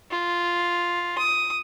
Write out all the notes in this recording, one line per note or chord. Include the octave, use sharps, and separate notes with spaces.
F4
D#6